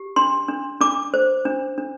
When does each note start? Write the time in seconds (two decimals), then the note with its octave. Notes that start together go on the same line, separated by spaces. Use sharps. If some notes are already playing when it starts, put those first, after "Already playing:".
Already playing: G4
0.16 D4 C6
0.48 D4
0.81 D4 D6
1.14 C5
1.45 D4
1.78 D4